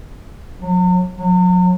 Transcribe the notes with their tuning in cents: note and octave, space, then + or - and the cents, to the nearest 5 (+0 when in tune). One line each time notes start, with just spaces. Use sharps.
F#3 -35
F#3 -30